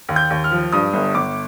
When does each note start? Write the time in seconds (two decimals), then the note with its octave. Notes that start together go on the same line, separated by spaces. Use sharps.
0.09 D#2
0.16 G6
0.30 D#2
0.44 F6
0.51 F3
0.72 G2 D#6
0.93 G1
1.15 G1 D6